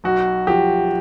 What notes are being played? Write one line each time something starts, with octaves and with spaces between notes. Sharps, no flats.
B1 F#4
F3 G4